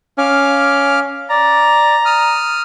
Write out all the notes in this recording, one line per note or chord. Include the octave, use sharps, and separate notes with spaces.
C#4 F5 D6 F6
D5 A#5
D#6 F6